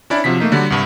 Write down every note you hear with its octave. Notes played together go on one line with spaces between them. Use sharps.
C#4 D4 E4 D5
C3 F3 F#3 B6
A3 A#3 D#4
D3 F#3 G3
C2 G2